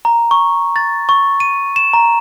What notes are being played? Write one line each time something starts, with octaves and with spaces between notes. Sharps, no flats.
A#5
C#6
A6
C#6
D#7
E7
A#5